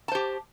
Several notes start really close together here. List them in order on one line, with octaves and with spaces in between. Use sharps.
A5 C5 G4